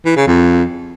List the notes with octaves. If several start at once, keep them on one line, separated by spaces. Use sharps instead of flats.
E3
C#3
F2